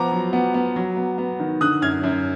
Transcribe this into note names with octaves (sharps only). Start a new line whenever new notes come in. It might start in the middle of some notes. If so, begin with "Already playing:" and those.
Already playing: F3 B3 A#5 D6
F#3
B3
B3
F#3
B3
B3
D#3
D3 D#6 F#6
F#2 F6 G#6
F#2